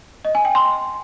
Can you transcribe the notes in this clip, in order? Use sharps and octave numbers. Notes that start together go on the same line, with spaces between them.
D#5
G#5
G5
C6